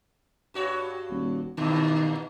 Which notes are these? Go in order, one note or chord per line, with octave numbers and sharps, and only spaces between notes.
G2 F#4 C#5
D#1
G2 A#2 D#3 E3